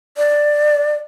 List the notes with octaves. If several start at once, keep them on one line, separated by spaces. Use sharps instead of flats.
D5